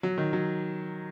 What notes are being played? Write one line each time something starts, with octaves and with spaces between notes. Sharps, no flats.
F#3
D#3
F#3